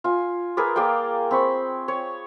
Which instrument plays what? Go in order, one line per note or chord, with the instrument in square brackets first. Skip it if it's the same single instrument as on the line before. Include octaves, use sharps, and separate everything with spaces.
[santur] F4 G#5
G#4 A#4 B4 D5
A#3 G#4 D5 G5
C4 B5 C#6
C#5